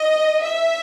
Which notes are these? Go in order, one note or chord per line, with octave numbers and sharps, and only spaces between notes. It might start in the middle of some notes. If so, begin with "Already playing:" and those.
Already playing: D#5
E5